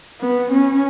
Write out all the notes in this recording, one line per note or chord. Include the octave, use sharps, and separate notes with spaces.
B3
C#4